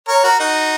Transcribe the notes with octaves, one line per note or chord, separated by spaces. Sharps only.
A#4 C#5
F#4 A#4
D#4 F#4